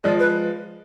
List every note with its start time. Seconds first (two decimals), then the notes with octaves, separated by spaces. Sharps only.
0.04 F3 G#3 D5
0.19 B4